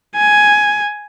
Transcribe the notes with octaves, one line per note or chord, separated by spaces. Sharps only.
G#5